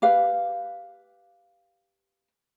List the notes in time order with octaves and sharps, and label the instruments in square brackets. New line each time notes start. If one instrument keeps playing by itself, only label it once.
[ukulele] G4 B4 F5